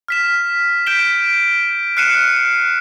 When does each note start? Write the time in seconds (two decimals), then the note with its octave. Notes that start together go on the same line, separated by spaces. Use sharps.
0.08 F6 B6 E7
0.86 G6 B6 D7 E7 G7
1.97 F6 F#6 C7 C#7 D#7 E7